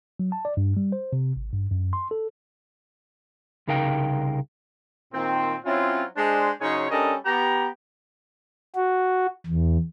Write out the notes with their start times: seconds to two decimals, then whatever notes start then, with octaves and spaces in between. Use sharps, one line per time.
0.20 F#3
0.32 A5
0.45 D5
0.57 G2
0.77 G3
0.92 C5
1.13 C3
1.36 G#1
1.53 G2
1.71 F#2
1.93 C6
2.11 A4
3.68 C2 C#3 D#4 A#4 F5 G5
5.13 A#2 D#3 A#3 C4
5.65 F#3 C4 C#4 E4 F4
6.16 G#3 D4 C5
6.61 C#3 F#3 D#4 G#4 C5 C#5
6.91 G3 C#4 D4 A4 A#4 D#5
7.26 B3 G4 A#5
8.76 F#4
9.46 E2